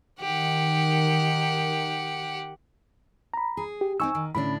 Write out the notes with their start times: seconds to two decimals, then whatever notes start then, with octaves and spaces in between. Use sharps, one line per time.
0.20 D#3 G4 F#5
3.34 A#5 B5
3.57 G#4
3.81 G4
4.00 C4 C#4 D#4 G#5 C#6 E6
4.15 D#3
4.35 A2 D3 C#4 D4 B5